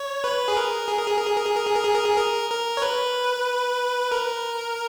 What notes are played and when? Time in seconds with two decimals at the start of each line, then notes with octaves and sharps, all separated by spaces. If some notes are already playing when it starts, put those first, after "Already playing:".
Already playing: C#5
0.24 B4
0.48 G#4
0.57 A#4
0.88 G#4
0.98 A#4
1.07 G#4
1.18 A#4
1.27 G#4
1.37 A#4
1.46 G#4
1.57 A#4
1.66 G#4
1.76 A#4
1.85 G#4
1.95 A#4
2.04 G#4
2.17 A#4
2.50 A#4
2.77 C#5
2.82 B4
4.12 A#4